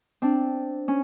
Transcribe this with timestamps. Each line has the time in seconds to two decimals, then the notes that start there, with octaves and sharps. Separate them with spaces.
0.22 C4 D4
0.88 C#4